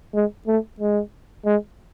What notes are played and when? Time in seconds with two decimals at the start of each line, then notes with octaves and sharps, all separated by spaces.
0.14 G#3
0.47 A3
0.80 G#3
1.46 G#3